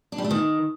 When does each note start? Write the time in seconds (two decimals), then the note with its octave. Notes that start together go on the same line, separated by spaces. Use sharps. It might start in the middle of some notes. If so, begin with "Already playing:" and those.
0.12 D4
0.18 G3
0.24 A3
0.31 D#3